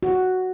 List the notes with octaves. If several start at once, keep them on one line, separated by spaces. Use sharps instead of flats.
F#4